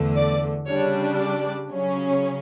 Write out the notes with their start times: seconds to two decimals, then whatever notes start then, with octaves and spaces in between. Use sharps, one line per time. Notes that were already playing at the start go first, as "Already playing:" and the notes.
Already playing: E2 D3 A3
0.16 D5
0.67 C#3 G3 D4 C#5
1.18 D5
1.68 C#3 F#3 C#4